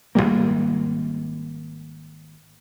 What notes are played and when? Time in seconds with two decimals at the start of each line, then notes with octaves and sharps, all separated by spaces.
0.15 G#1 F2 G3 A#3